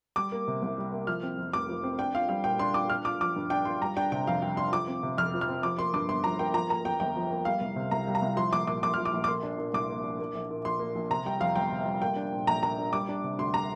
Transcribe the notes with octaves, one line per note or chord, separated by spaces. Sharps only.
G3 D6
A#3
C3
C2
G3
A#3
F3 F6
C4
F2
F1 D6
F3
C4
D4 G5
F4 F5
G3 F5
A#2 G5
D4 C6
F4 D6
D4 F6
F4 D6
F3 D6
G2
D4 G5
F4 C6
G3 A#5
D4 G5
C3 G5
F2 F5
G3 G5
D4 C6
F3 D6
C4
C3
F2 F6
F3
F6
C4
F3 D6
A#3 C6
G2 D6
G1 C6
F3 A#5
A#3 G5
F3 A#5
A#3 A#5
F2 G5
G1 G5
F3
A#3
G3 F5
C2
C3
C2 A#5
G3
A#5
C2
F3 C6
A#1 D6
A#2 D6
A#1 D6
F3 F6
D6
A#1
D6
A#3 C6
D4
A#2
C2 D6
A#3
D4
A#3
A#1
A#2
A#1 C6
A#3
A#1
C3 A#5
G3 G5
F2 F5
G1 G5
C3
G3
A#3 G5
D4
A#2
A#1 A#5
A#3 A#5
D4
G3 D6
D4
C3
D2 C6
G3 A#5